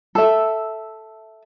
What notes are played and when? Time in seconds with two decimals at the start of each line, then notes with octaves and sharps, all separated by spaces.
0.15 A4 E5